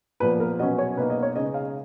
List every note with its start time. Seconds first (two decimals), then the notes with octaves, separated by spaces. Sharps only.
0.20 A#2 F3 B3 B4
0.40 A#4
0.59 B2 F#3 C#4 D#5
0.78 C#5
0.97 B2 A#3 D#4 B4
1.10 D#5
1.23 C#5
1.36 C#3 G#3 D#4 D#5
1.54 F5